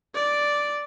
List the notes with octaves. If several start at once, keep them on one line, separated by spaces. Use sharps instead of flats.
D5